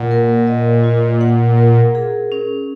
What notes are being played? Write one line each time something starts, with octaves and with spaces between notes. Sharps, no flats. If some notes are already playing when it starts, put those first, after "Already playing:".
Already playing: A#2 F#5
A#4
D#5
F4
F#5
A#4
G#4
C#4